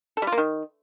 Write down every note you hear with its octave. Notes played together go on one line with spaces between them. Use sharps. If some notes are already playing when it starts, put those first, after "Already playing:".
A4
G3
F4
A#3
D#3